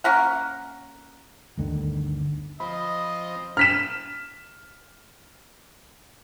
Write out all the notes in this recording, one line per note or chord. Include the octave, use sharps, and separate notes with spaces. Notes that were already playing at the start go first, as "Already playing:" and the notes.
A#3 C#4 A#4 F#5
G1 D2 D3 D#3
F3 C4 D#5 B5
F6 B6 E7